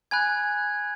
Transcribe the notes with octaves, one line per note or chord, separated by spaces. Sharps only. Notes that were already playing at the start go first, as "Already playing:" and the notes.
G#5 B5 F#6 G#6